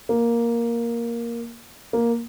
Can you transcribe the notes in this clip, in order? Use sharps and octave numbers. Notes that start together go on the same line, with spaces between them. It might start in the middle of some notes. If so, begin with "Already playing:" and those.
A#3
A#3